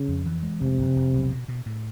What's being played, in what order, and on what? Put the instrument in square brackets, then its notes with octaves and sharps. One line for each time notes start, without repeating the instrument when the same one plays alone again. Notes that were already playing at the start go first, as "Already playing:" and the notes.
Already playing: [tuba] C#3
[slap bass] F2
E3
G#3
[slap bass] F1 [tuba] C3
[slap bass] F1
F1
B1
B2
B2
A2